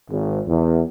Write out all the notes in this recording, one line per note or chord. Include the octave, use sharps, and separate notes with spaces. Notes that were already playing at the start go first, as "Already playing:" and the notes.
G#1
E2